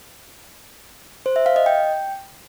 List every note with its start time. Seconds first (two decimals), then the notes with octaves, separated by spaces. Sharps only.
1.26 C5
1.36 E5
1.46 F5
1.56 D#5
1.66 G5